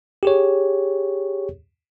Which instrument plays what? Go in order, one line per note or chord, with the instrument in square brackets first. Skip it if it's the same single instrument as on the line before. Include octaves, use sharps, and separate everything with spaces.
[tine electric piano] G4 G#4 C#5